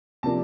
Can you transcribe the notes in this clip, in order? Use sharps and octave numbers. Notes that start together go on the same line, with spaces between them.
C3 F3 A#3 D4 A5